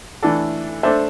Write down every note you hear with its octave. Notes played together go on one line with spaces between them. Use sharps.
E3 A3 D4 A4
A3 D4 A4 C5 E5